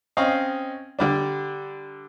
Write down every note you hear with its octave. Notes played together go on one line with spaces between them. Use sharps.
C4 C#4 D#5 F5
D3 G3 D4